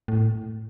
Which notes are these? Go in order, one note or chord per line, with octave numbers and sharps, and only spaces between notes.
A2